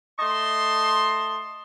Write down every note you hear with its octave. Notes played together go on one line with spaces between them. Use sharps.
A3 D#5 A5 C6